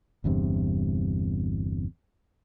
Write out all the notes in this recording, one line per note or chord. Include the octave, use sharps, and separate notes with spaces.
G1 E2 G2 C3